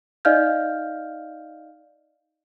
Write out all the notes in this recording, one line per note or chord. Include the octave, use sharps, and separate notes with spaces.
D#4 D5 D#5 F5 F6 G6